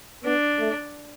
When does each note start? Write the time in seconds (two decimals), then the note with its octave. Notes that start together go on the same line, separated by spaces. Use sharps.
0.24 B3 D4
0.59 A3